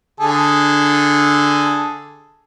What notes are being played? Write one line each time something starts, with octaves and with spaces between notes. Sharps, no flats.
D3 G#4 A4